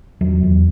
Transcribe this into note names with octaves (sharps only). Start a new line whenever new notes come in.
E2 F#3
E2